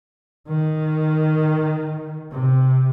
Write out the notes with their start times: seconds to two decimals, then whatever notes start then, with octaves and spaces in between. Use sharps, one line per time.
0.48 D#3
2.31 C3